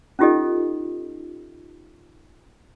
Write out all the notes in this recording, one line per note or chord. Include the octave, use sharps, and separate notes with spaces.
C#4 D#4 F4 G4 A4 D#5